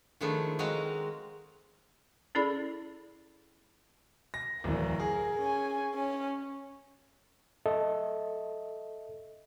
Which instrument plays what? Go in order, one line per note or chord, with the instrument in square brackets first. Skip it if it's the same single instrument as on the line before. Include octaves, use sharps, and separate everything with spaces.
[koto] D#3 F3 G#3 A3 D4 E4
G#3 C4 F#4 D#5 F5 A#5
[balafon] C#4 E4 G#4 A4 D5 B5
[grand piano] A#6
[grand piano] D1 E2 [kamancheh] A#4
[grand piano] G#4
[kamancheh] C#4 G#5
C#4
[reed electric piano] A4 D#5 E5